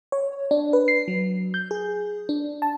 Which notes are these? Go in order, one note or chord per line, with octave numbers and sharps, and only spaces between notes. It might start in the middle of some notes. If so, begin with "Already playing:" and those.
C#5
D4
B4
C7
F#3
G6
G#4
D4
A5